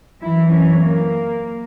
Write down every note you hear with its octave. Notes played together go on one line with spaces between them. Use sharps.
F#2 E3 E4
C#4
A#3